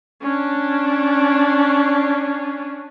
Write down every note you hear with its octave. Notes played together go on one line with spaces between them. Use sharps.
C#4 D4